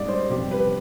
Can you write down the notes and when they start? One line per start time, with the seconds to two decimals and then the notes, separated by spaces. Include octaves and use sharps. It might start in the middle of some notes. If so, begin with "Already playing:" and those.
Already playing: G#2 G3 D5 D#5
0.09 C5
0.30 F2 C3 G3 G4
0.51 B4